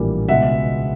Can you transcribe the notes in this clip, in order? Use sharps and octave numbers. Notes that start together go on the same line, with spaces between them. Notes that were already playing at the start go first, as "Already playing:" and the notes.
Already playing: A#1 A2 E3 G3 A#3
C#2 B2 G#3 B3 E5 F#5